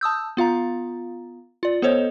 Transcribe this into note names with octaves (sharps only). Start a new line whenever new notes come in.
A5 D#6 E6 G6
B3 F4 F5 A#5
F4 D5
B3 A4 C5 C#5 D#5